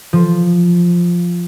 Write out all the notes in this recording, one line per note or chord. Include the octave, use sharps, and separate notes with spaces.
F3